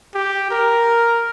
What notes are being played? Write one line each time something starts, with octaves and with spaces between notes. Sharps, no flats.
G4
A#4